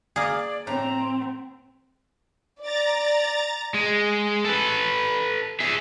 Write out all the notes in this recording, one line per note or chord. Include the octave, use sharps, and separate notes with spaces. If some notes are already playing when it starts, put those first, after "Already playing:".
A#3 G#4 D5
A2 C4 A#5
D5 A#5 A6
G#3
A4 B4
G#4 E5